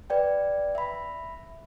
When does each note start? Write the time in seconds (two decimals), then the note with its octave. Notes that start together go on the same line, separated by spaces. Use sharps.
0.10 B4 D5 G5
0.75 E5 B5